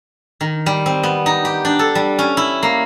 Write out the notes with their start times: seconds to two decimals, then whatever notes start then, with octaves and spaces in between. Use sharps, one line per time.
0.41 D#3
0.66 G3
0.86 C4
1.03 B3
1.26 D#4
1.45 G4
1.65 D4
1.79 A4
1.95 G3
2.19 C#4
2.37 E4
2.63 A#3